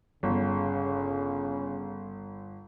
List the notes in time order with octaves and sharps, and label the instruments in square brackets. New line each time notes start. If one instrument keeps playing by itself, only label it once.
[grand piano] G1 [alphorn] C#3